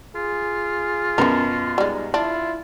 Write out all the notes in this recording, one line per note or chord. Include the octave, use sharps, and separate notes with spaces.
F4 G#4
F#2 B2 C#4 A#4
G3 G#3 D#4
D4 E4 F4